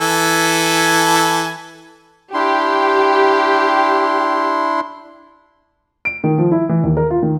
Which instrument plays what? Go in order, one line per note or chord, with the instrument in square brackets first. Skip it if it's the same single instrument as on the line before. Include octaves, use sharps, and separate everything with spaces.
[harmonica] E3 A4 G#5
[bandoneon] D4 E4 C6 [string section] G4
[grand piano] D7
D#3
F3
E4
E3
D#2
A#4
F4
D#3